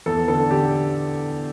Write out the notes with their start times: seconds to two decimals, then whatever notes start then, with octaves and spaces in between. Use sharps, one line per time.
0.06 E2 A4
0.28 D3 A4
0.51 D3 G4